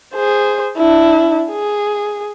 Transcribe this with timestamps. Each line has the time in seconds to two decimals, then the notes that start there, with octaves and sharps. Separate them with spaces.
0.14 G#4 C5
0.77 D4 E4
1.51 G#4